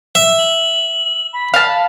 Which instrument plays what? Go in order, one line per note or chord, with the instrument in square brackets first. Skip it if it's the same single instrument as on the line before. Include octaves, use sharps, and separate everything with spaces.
[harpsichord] E5
[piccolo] F#7
B5
[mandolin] F5 A5